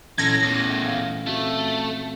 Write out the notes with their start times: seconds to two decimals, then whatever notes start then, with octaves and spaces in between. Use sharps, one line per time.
0.18 A#2 E3 C#4 D#4 A4 G#6 A#6
0.43 E2 A2
0.83 F3 A3 F5
1.26 A3 C4 F4 F#4